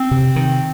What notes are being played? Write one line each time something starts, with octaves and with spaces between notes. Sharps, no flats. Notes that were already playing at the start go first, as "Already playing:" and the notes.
Already playing: C4
C3
D#3